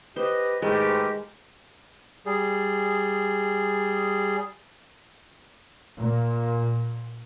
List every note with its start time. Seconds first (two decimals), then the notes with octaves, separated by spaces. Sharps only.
0.16 G4 B4 C5 D#5
0.62 G#2 D#3 G#3 A3 G4 A#4 B4
2.26 G3 G#4
5.96 A#2